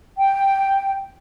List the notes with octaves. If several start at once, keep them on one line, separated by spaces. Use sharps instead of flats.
G5